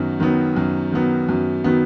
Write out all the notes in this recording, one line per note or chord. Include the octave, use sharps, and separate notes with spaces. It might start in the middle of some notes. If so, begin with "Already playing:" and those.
Already playing: F#2 D#3 F#3 B3
D#3 F#3 B3
F#2
D#3 F#3 B3
F#2
D#3 F#3 B3